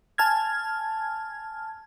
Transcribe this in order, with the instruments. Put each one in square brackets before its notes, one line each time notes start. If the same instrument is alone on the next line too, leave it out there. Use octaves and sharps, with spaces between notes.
[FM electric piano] G#5 A5 F6 G#6